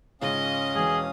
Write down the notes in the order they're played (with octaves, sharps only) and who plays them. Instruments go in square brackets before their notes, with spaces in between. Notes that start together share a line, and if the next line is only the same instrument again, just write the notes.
[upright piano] G#2 C#3 F4 [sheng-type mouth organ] C#4 F5 D#6 [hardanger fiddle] D#5
[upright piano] E1 E3 [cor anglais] G#4